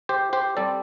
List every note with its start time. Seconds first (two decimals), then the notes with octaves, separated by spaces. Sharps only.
0.09 G4 C5
0.33 G4 C5
0.57 G3 C4 A4 D5